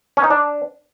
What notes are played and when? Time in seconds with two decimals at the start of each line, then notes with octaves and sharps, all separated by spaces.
0.17 C#4
0.24 D#4
0.30 D4